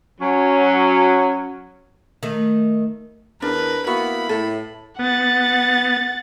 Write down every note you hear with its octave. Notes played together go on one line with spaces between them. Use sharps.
F#3 C#4
D#3 A3
E2 D4 A#4 B4
A#3 B3 E4 F#4 B5
A2 A4
B3 F#5 A6